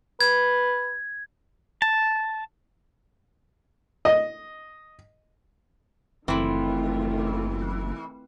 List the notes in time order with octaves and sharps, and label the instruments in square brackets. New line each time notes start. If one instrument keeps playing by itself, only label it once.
[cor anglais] B4 [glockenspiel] G#6
[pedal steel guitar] A5
[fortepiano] D#5
[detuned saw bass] F#1 [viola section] D#3 A3 F4 [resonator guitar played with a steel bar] E3 [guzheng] C4 E4